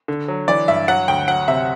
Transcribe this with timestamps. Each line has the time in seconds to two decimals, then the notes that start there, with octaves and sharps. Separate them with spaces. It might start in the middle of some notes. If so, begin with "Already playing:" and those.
0.08 D3
0.28 F#3
0.48 E3 D5
0.68 G2 E5
0.88 F#3 F#5
1.08 D2 G5
1.28 F#3 F#5
1.48 C3 E5